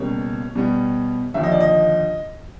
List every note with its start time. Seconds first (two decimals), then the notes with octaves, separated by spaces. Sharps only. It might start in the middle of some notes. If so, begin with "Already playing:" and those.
Already playing: C#2 B2 G3 A#3 C#5
0.55 B2 G3 B3
1.34 D#2 D3 F3 E5
1.43 D#5
1.51 D5
1.60 D#5